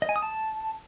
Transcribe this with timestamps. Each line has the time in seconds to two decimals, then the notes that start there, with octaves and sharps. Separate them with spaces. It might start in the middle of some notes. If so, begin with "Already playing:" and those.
0.02 D#5
0.09 G#5
0.16 D#6
0.22 A5